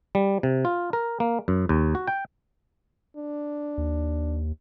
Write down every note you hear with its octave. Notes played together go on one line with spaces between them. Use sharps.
G3
C3
F4
A#4
A#3
F#2
D#2
F#4
G5
D4
D#2